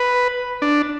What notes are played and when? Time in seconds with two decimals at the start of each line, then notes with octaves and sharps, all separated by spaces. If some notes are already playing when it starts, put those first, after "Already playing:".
Already playing: B4
0.62 D4